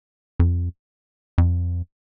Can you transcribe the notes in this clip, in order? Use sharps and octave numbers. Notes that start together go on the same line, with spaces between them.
F2
F2